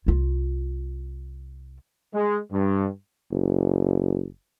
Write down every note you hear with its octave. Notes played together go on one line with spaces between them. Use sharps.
C2 F4
G#3
G2
F#1